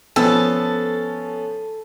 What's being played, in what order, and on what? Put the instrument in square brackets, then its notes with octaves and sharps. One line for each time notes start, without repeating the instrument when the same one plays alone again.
[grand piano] F3 B3 C#4 [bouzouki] A4